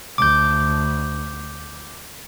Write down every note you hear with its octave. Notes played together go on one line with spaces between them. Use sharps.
D2 D6 G6